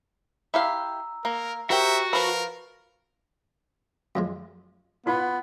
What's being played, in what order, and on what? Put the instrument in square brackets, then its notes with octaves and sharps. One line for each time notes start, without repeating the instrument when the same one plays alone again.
[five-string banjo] E4 G4 F5 [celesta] A#5 E6
[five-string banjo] A#3 [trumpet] A#4
[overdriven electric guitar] F#4 [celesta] G4 C5 A#5 [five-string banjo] A#4 G5 [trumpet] E5
[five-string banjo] F3 B5 [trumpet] A#4 [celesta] B4
[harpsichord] F#2 F3 G#3
[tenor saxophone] B3 [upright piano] F4 B5